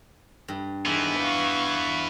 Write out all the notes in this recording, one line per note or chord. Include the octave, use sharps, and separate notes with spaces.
G2
D#3 E3 G#3 B3
F5 C#6